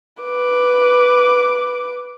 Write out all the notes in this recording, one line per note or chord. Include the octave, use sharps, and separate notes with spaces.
B4 D6